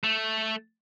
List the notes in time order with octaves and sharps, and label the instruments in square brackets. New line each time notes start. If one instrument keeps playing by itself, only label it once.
[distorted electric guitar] A3